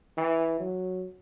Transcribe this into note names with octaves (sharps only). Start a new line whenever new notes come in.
E3
F#3